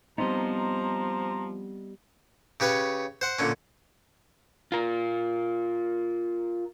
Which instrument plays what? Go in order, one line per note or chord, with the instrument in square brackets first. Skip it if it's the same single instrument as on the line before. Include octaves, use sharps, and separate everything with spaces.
[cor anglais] F3 [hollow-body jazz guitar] G3 C4 D#4 [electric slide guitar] B3 D#5 [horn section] C5 A#5
[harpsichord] C#3 G4 B4 C#5
C5 F#5
A#2 D3 C#4
[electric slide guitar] F4 A#4